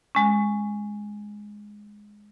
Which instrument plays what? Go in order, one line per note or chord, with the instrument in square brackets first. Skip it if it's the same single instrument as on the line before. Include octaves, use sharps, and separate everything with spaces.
[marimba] G#3 C#4